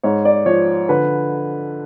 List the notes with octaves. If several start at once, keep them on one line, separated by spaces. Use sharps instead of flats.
G#2 C#5
D5
F3 C#5
D3 B4